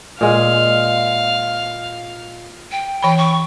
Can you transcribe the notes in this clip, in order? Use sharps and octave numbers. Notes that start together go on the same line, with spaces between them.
A#2 G#3 F5
G5
E3 G5 B5
C#6